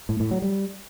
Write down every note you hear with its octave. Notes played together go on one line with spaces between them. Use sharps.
A2
A2
F#3
G3